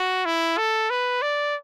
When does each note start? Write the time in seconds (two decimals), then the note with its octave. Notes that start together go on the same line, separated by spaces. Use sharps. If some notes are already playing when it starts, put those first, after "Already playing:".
Already playing: F#4
0.25 E4
0.58 A4
0.90 B4
1.22 D5